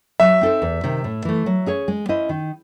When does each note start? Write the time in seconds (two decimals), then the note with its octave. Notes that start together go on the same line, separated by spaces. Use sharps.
0.20 F#3 E5
0.41 C4 D#4 A4 C5
0.62 E2
0.83 C3 D#3
1.04 A2
1.25 E3 A3
1.46 F#3
1.66 C#4 G#4 C#5
1.88 G#3
2.09 C#4 E4 C5 D#5
2.29 D#3